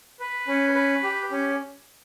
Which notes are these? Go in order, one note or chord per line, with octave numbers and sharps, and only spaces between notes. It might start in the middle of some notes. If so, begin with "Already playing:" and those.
B4
C#4
B4
G4
C#4